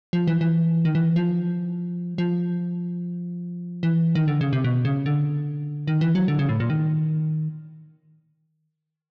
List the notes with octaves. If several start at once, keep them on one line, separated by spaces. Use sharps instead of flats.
F3
E3
E3
D#3
E3
F3
F3
E3
D#3
D3
C#3
C3
B2
C#3
D3
D#3
E3
F#3
D3
C#3
A2
A#2
D#3